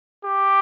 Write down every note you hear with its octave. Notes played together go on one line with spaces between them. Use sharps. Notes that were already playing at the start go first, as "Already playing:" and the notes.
G4